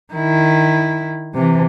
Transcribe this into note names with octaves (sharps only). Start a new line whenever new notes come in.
D#3 E4
C3 E3